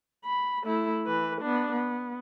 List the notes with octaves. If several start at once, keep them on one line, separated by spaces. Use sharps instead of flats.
B5
A3 E4
E3 B4
B3 D4
B3